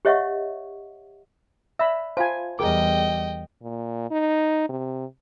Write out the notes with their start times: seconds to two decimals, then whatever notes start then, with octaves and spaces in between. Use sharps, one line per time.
0.05 G4 C#5 D#5 E5 F#5 C#6
1.79 D5 E5 B5 E6
2.17 F4 C5 F5 G#5 A5
2.59 E2 G3 G#4 A#4 D#5 G5 D6
3.63 A#2
4.11 D#4
4.69 C3